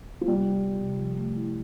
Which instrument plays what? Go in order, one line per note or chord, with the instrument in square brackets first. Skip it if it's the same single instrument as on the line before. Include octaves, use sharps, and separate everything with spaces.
[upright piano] F3
[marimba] C3 [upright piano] G3
[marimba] F4
B3
C3
F3
A3
E4